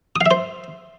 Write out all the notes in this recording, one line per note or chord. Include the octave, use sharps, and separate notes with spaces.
D#6
F5
E5
C5